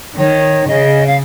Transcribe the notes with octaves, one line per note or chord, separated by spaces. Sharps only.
D#3 C#5
C#3 D#5
F5